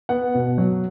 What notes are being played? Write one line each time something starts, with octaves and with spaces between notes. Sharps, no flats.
B3 F#5
B2
F#3